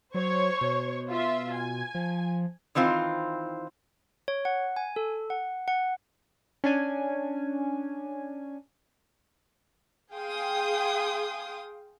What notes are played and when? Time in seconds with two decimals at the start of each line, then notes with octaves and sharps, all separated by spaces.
0.14 F#3 C5 C#5 C#6
0.61 B2
1.09 F4 E5
1.56 G#5
1.95 F3
2.75 D#3 E3 C4 F4 C5
4.28 C#5
4.45 F#5
4.76 G#5
4.96 A4
5.30 F#5
5.68 F#5
6.64 C#4 D4 G#5
10.13 G#4 F5 G5 C6 D#6